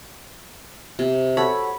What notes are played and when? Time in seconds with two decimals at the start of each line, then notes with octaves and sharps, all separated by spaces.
0.99 C3
1.37 F#4 A4 C#5 B5